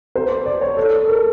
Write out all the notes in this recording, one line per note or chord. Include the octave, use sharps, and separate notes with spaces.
C5
D5
C#5
A4
A#4